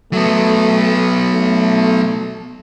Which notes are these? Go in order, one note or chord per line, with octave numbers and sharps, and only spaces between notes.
F#3 A3 B3
A3